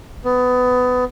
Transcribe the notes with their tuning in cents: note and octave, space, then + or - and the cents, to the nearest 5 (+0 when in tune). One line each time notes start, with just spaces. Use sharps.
B3 +20